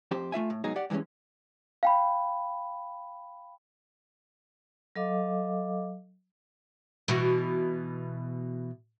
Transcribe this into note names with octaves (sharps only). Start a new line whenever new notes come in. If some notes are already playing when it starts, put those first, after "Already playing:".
F2 G4 C5
A3 F4 E5 G#5
A2
G#2 B2 F#3 D#4 G#4
G4 D5 F#5
G2 E3 F#3 G#3 C#4
F5 G5 B5
F#3 A4 D#5 F5 D6
B2 E3 F#4